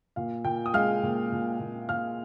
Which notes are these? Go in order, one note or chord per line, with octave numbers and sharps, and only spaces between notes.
A#2 F5
A#2 G5
D#6
G#3 F5 F6
A#2
A#2
A#2
A#2 F5 F6